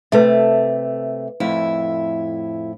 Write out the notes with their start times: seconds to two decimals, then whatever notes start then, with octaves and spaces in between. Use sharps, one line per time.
0.12 C3 A3 B4 E5
1.40 F2 A2 E4